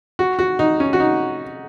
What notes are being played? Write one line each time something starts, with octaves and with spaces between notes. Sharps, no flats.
F#4
F#4
D#4
C#4
F#4
D#4